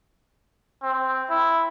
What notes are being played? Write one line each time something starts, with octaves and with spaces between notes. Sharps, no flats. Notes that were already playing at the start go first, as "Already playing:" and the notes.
C4
E4